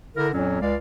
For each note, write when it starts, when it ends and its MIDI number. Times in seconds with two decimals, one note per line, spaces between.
0.16 0.28 50
0.16 0.28 64
0.16 0.28 70
0.33 0.60 41
0.33 0.60 46
0.33 0.60 54
0.33 0.60 61
0.61 0.75 37
0.61 0.75 56
0.61 0.75 74
0.61 0.75 77